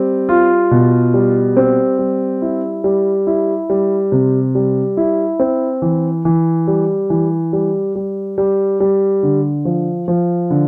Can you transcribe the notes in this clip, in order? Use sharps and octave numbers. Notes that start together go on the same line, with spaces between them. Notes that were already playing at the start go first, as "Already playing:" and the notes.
Already playing: G3 C4
F4
B2
G3
C4
G3
E4
G3
E4
G3
C3
G3
E4
C4
E3
E3
G3
E3
G3
G3
G3
G3
D3
F3
F3
D3